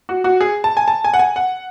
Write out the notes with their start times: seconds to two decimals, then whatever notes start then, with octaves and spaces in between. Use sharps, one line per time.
0.09 F#4
0.24 F#4
0.41 G#4
0.64 A5
0.77 G#5
0.88 A5
1.04 G#5
1.14 F#5
1.19 G#5
1.36 F#5